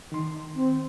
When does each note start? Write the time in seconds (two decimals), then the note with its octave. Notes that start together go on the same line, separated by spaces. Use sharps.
0.12 D#3 C6
0.55 C4